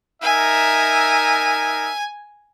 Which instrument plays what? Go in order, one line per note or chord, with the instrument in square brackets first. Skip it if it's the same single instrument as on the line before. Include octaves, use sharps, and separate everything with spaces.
[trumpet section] D#4 A#4 E5 [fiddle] G#5